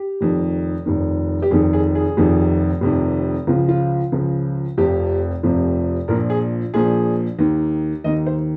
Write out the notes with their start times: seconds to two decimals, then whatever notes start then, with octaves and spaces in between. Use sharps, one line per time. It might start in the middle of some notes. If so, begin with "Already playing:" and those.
Already playing: G4
0.21 F1 F2 D#3
0.86 F1 F2 D#3
1.42 G4
1.51 F1 F2 D#3 G#4
1.73 G#4
1.95 G#4
2.17 F1 F2 C3 D#3
2.81 F1 F2 C3 D#3
3.47 C#2 C#3 F3 F4
3.69 F4
4.12 C#2 C#3 F3
4.78 F1 F2 C3 F3 G4
5.43 F1 F2 C3 F3
6.08 A#1 A#2 F3 A#4
6.30 G#4
6.74 A#1 A#2 F3 G#4
7.39 D#2 D#3
8.04 D#2 D#3 D#5
8.26 C5